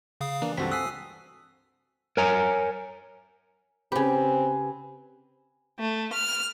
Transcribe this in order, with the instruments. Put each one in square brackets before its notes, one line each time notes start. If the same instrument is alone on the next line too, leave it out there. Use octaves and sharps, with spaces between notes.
[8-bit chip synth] C#3 F5 D#6
[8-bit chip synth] E3 [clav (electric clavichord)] A#3 [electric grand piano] D4
[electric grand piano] C#2 G2 [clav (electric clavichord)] C4 F#4 A4 [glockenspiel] B6
[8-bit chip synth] G#5 D#6 [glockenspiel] E6 [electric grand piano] F#6 B6 C7
[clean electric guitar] A#4 C#5 G#5 A#5
[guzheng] C#3 G4 [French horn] C4 [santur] B4 G#5
[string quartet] A3
F6